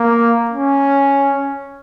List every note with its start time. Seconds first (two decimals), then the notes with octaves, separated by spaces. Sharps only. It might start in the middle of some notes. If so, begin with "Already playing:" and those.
Already playing: A#3
0.50 C#4